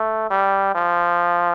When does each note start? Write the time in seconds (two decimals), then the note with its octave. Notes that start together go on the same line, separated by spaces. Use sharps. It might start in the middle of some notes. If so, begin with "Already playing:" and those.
Already playing: A3
0.30 G3
0.75 F3